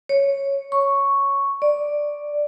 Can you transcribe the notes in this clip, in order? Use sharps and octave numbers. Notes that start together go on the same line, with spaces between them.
C#5
C#6
D5